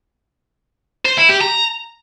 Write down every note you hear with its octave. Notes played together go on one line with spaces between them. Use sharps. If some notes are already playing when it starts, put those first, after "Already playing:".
C5
E4
G4
A#5